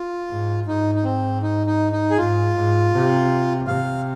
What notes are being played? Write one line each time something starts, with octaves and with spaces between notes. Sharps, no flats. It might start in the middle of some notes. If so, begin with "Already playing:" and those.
Already playing: F4
G#2
G#2 D#4
D#4
C4
D#4
D#4
D#4
G#4
G#2 F4
G#2
C3
C3 F5